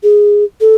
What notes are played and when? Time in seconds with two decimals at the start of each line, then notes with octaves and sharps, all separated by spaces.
0.03 G#4
0.61 A4